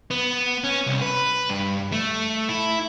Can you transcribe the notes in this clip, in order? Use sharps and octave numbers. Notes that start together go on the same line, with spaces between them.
B3
C#4
C2
B4
G2
A3
E4